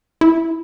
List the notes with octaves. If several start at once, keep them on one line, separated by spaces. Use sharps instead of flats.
E4